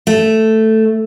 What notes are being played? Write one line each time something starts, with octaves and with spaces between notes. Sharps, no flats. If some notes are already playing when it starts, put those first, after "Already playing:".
A3